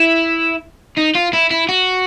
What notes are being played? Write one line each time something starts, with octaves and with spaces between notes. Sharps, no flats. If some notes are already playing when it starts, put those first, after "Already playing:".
Already playing: E4
D#4
F4
E4
E4
F#4